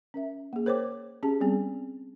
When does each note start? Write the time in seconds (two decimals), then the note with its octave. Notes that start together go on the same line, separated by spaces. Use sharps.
0.14 C#4 A#4 E5
0.53 A#3 G#4
0.66 A#4 C5 C#5 G5 D6
1.23 C#4 G4 G#4 A5
1.40 G3 B3 C4 G#4